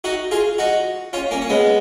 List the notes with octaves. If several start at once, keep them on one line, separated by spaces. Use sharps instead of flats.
D#4 F#4
F4 G#4
D#4 F#4
C#4 F4
A#3 C#4
C#4
G#3 B3